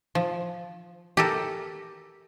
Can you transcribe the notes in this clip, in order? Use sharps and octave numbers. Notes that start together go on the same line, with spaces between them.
F3
G4 A4 A#4